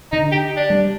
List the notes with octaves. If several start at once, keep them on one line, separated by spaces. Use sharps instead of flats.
D3 D#4
G4
D4
G3